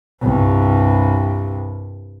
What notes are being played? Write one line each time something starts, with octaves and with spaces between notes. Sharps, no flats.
C2 G2